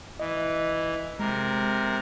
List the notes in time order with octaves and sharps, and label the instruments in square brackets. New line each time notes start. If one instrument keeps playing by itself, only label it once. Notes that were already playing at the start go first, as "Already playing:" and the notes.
[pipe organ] E3 [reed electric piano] D#5
[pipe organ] C3 A#4 [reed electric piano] G#3